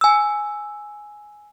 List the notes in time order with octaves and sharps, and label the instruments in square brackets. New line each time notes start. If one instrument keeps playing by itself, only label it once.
[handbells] G#5 E6